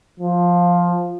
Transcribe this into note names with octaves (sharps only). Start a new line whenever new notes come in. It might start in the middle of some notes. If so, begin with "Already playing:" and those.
F3